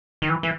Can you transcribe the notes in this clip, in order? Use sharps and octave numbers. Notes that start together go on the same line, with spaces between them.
D#3
E3
E3